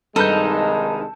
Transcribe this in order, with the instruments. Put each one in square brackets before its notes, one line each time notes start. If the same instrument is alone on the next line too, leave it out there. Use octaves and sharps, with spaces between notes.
[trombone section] C2 D#3 G#3 [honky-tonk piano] G2 B4 G6 [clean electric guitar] D#4 [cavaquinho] A4